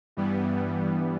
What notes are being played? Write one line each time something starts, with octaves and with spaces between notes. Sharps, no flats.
G2 E3 G3 B3